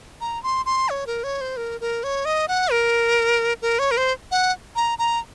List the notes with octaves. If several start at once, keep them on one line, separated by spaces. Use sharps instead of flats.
A#5
C6
C6
C#5
A#4
C#5
C5
A#4
A#4
C#5
D#5
F#5
A#4
A#4
C#5
A#4
C5
F#5
A#5
A#5